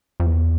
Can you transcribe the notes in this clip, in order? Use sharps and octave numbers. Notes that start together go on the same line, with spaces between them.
F2
E2